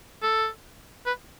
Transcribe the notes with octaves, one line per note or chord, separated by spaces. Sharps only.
A4
B4